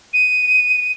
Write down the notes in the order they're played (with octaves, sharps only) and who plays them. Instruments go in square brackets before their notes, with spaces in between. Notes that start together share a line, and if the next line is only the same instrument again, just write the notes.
[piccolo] D#7